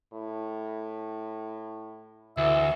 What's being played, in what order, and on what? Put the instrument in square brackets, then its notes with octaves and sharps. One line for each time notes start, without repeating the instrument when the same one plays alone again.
[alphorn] A2
[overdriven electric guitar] D2 [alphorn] E3 [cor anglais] E5